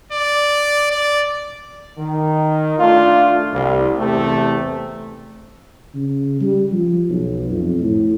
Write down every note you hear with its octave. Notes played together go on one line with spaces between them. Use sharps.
D5
D5
D#3
A3 D4 F4
C2
E2 C3 A3
C#3
G3
F3
B1
F2
A2